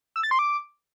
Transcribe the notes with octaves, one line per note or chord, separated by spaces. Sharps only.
E6
A6
C6
D6